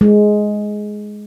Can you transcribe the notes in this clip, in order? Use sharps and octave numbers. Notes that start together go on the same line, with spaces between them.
G#3